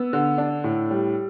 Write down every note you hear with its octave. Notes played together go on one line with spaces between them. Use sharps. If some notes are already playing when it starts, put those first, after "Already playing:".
Already playing: B3 E6
D3
D4
A2
G3